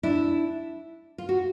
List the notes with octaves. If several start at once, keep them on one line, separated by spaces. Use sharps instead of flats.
D4 E4
F4
F#4